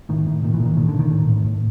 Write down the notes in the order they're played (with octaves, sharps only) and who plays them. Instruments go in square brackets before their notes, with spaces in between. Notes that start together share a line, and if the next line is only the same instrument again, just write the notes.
[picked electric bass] A2 D#3
A2
A#2 D#3
E3
A#2
D#3
A#2 D#3
D3
A#2
D#3
A2
A2
A2